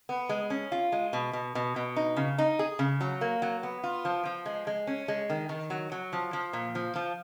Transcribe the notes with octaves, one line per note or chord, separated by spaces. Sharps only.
B3
G#3
C#4
F4
G#3
B2
B2
B2
B2
D#4
C#3
D#4
G#4
C#3
F#3
A#3
F#3
B3
F4
F3
F3
G#3
G#3
C#4
G#3
D#3
D#3
F#3
F#3
F3
F3
A#2
F3
F3